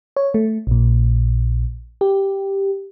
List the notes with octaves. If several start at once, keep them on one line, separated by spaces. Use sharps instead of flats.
C#5
A3
A#1 A#2
G4